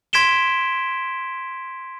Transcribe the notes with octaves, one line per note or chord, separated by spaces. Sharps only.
C6 G#6 B6 D7 E7 G7